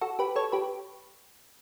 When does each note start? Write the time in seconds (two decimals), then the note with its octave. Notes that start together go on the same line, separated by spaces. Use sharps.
0.01 F#4 A4
0.19 G4 B4
0.36 A4 C#5
0.52 G4 B4